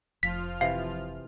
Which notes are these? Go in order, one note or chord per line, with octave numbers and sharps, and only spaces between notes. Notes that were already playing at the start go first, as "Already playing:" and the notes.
F1 F3 F4 F6 B6
C3 E3 F5